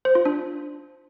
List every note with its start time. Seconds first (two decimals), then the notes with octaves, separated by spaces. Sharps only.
0.05 C5
0.15 F4
0.25 D4